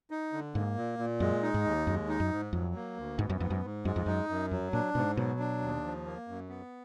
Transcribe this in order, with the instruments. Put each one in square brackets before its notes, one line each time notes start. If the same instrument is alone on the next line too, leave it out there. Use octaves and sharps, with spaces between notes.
[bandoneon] D#4
D3
[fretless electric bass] G#2 [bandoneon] A#3
[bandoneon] A#2
A#2
[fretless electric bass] F#2 [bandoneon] G#3
[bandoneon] D#4
[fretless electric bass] G#2
[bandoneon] D#2
[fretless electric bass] F#2 [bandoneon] G#3
[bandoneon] D#4
[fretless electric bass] F#2
[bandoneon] G#2
[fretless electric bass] F2 [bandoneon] F#3
[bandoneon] A#3
D2
[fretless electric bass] G#2 [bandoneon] B3
[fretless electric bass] F#2
[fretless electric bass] F2 [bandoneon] G#2
[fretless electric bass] F#2
[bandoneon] G#2
[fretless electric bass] F#2 [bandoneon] G#3
[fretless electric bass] F2
[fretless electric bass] F#2 [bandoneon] D#4
[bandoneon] F#2
[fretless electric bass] F2 [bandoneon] F#3
[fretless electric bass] A#2 [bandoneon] D4
[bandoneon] G#2 [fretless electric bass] B2
[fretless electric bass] B2 [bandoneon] F#3
[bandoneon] D4
D#2
F3
A#3
F#2
B3